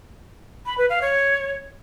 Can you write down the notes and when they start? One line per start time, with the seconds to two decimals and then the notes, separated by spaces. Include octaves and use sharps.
0.66 B5
0.78 B4
0.90 F5
1.02 C#5